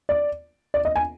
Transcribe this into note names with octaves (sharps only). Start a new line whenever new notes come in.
D5
D5
D#5
G#5